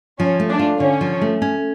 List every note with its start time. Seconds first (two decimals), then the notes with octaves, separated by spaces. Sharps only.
0.19 F3 C#4
0.40 A3
0.50 D4
0.59 F4
0.80 D3 C#4
1.01 F3
1.22 A3
1.42 C#4